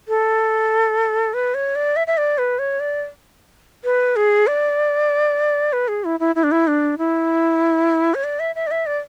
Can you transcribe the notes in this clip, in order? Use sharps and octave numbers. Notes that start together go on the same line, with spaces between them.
A4
B4
C#5
D5
E5
E5
D5
B4
C#5
D5
B4
G#4
D5
B4
G#4
E4
E4
E4
D4
E4
D4
E4
C#5
D5
E5
E5
D5
E5
D5